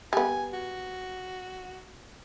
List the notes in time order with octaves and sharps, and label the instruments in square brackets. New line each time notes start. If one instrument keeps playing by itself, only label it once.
[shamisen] G3 B3 [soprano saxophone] G#5
[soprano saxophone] F#4